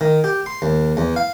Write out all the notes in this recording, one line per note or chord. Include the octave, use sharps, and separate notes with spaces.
D#3
G4
C6
D#2
E2
F5